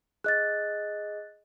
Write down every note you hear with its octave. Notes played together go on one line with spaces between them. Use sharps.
G#4 D#5 F#6 A6